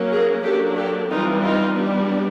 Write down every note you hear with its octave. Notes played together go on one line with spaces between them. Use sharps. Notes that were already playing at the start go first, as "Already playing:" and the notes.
Already playing: F#3 A#3 C#4
G#4 A#4
F#3 A#3 D4 G4 A4
G4 A4
E3 G3 C4 D#4 F4
D#4 F4
G3 B3 D4